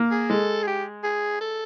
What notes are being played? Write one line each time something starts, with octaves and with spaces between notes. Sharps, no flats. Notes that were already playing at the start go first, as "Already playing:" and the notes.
Already playing: A#3
G#4
G#3 A4
G#4
G4
G#4
A4